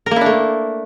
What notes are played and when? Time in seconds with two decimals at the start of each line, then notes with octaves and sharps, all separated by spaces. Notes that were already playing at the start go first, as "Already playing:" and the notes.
0.06 A#4
0.11 A#3
0.16 E4
0.21 D4
0.26 A3